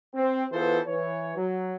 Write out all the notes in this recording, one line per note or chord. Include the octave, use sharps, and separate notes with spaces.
C4
E3 B3 F4 G#4 A4 C5
E3 C#5
F#3